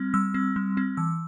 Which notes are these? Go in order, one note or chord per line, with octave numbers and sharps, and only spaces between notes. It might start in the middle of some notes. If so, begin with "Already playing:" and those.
Already playing: G3 C4
G3 E6
C4
G3
C4
E3 E6